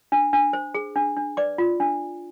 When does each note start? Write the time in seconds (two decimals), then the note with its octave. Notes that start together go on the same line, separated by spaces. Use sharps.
0.12 D4
0.33 D4
0.53 C5
0.74 G#4
0.96 D4
1.16 D4
1.37 B4 D5 D6
1.58 F4
1.80 D4